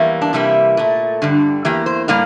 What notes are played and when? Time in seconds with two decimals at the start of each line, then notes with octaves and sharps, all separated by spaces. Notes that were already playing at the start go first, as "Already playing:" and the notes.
Already playing: E2 E3 G3 A#3
0.22 D4
0.33 C3 E3 G3 A#3 E4
0.77 A#2 A3
1.22 G2 D3 G3
1.65 E2 E3 A#3 G4
1.86 C5
2.08 A2 G3 A#3 F5